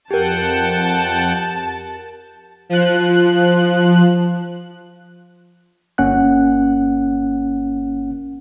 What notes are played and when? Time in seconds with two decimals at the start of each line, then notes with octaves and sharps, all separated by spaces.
0.11 F2 G4 A#4 F#5 G5 A5
2.69 F3 F#6
5.98 G1 A#3 C#4 F#5 F#6